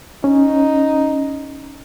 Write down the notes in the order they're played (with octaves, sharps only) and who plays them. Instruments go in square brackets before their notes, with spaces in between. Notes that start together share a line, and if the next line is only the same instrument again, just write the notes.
[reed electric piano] C#4 [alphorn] D#4